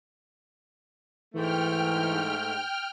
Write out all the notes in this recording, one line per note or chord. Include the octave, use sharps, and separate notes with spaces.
G#2 E3 A3 G5 F6